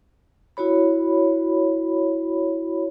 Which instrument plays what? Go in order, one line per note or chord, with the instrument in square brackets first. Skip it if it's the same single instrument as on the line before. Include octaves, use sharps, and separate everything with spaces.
[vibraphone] E4 F#4 C#5 B5